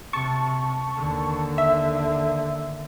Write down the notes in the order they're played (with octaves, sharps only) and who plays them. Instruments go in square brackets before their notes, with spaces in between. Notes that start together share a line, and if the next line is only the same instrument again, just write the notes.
[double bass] C3 [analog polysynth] A5 C#6
[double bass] D#2 D3
[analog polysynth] E5